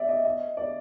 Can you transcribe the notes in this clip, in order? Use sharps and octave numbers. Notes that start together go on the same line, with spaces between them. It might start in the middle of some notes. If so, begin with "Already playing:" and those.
Already playing: D5 E5
D#5
D#5
D5